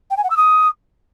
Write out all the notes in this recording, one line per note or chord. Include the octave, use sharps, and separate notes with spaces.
G5
G#5
F#5
E6
D#6